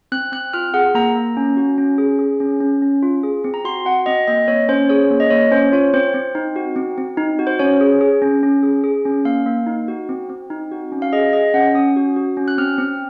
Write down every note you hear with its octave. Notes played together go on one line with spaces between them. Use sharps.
C4 F#6
C4 F#6
F4 F6
G#4 F#5
A#3 A#5
A#3
C#4
F#4
C#4
G#4
G#4
C#4
C#4
C#4
F4
G#4
C4
A#5
F#4 C6
F#4 F#5
C4 D#5
A#3 D#5
A#3 C#5
C#4 C5
G#4 C#5
A#3
D#5
A#3 C#5
C#4 C5
F4 C#5
C4 C5
C4
D#4
F#4
C4
C4
D#4
F#4
C5
C#4 C#5
G#4
G#4
C#4
C#4
G#4
G#4
C#4
A#3 F5
A#3
D#4
F#4
C4
C4
D#4
F#4
C#4
F5
G#4 D#5
G#4 D#5
C#4 F#5
C#4 D#6
F#4
F#4
C#4
F#6
C4 F6
C4